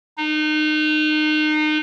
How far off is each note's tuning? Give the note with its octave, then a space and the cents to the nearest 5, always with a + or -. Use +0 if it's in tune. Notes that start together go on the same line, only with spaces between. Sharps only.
D#4 -30